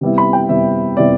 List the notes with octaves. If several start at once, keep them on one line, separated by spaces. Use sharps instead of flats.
C3 G3 B3 E4
B5
G5
C3 G3 B3 E4 E5
C3 G3 B3 E4 D5